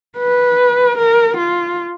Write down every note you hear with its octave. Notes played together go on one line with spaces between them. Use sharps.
B4
A#4
F4